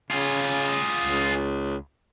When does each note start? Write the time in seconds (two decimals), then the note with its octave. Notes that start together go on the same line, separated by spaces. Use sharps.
0.10 C#3 F4 G#4
1.04 C#2